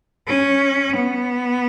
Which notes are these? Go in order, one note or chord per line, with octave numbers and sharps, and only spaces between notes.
C#4
B3